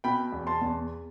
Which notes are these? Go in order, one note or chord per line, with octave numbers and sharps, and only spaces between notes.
B2 G5 B5
E2
A5 C6
E2